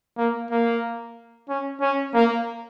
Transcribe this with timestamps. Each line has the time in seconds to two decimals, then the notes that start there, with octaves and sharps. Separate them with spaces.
0.18 A#3
0.51 A#3
1.49 C#4
1.81 C#4
2.14 A#3